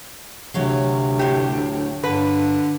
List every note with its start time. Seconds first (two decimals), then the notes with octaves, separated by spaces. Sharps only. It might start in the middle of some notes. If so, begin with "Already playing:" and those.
0.54 D2 C3 F#3 C#5 F5
1.19 A2 G4
2.04 G2 D3 B4